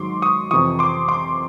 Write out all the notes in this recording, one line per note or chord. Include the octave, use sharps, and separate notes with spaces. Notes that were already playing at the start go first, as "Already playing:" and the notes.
Already playing: G#2 D#3 F#3 C6 D6
C#6 D#6
F2 C3 E3 C#6 D#6
C6 D6
C6 D6